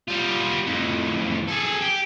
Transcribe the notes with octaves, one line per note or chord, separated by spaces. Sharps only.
G3 F4
F2 A2
G#4 A4
G4